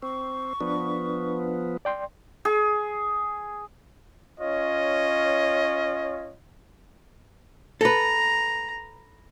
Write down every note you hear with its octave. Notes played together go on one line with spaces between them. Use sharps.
C4 C#6
F3 B3 D4 B4
D5 G5 C6
G#4
C#4 F4 C#5 D#5
A4 B4 A#5